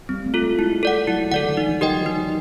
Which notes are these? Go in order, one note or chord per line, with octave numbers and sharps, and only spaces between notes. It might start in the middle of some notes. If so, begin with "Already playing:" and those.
G3 C4
A3
F4 A4
G#3
G#3 E4
A4 D5 F#5
F#3 E4
D3 A4 D5 F#5
D#3
E3 D#4
F3
F#3 G4 A#4 D#5 G5
F#3
D#4